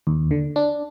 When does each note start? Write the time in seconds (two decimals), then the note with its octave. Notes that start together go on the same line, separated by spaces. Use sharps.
0.07 D#2
0.31 D3
0.56 D4